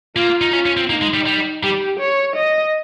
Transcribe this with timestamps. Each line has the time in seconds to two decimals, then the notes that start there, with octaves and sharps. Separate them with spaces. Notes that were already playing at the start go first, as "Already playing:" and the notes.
0.16 A#3 F4
0.41 D#4
0.53 C#4 F4
0.66 C#4
0.77 C4
0.90 A#3 D#4
1.02 G#3
1.14 G3
1.26 G3
1.63 G3 G4
1.99 C#5
2.36 D#5